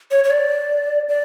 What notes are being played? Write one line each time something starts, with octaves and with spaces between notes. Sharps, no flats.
C#5
C#5
D5
D5